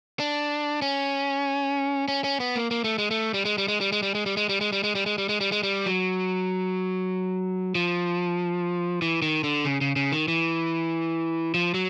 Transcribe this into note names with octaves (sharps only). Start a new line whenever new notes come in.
D4
C#4
C#4
C#4
B3
A#3
A#3
A3
G#3
A3
G3
G#3
G3
G#3
G3
G#3
G3
G#3
G3
G#3
G3
G#3
G3
G#3
G3
G#3
G3
G#3
G3
G#3
G3
F#3
F3
E3
D#3
D3
C#3
C#3
C#3
D#3
E3
F3
F#3